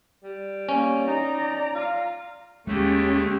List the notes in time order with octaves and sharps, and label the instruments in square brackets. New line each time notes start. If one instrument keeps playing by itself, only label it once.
[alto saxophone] G3
[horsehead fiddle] A#3 [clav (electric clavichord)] C#4
[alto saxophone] D#4 [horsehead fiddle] D5 A#5
[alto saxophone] F4
[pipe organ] D#2 D3 A3 [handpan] G#3 [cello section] C#4 G4